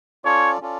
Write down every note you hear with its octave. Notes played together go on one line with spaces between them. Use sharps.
C#4 F4 A4 C#5 D5
C#4 F4 A4 D5